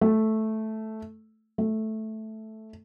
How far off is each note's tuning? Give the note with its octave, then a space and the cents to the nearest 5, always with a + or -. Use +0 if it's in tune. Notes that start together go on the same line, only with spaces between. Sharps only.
A3 -5
A3 -5